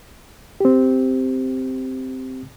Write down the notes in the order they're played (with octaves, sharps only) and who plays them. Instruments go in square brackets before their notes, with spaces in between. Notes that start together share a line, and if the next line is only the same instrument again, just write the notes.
[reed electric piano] C4 G4